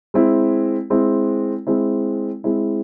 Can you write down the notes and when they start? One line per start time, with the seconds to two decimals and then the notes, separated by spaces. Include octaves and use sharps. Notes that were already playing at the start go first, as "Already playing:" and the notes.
0.14 G#3 C4 E4
0.90 G#3 C4 E4
1.67 G#3 C4 E4
2.44 G#3 C4 E4